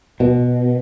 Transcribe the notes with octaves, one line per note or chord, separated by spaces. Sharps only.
B2